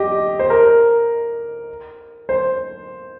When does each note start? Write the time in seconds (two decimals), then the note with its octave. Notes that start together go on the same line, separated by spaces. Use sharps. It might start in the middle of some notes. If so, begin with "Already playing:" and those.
Already playing: G4 D#5
0.39 C5
0.50 A#4
2.29 C5